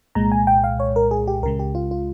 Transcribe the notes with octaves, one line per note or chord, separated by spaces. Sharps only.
C2 A#2 G#3 A#5
G#5
G5
F5
C#5
A#4
G#4
G4
C#2 C#3 G#3 A#4
G4
F4
F4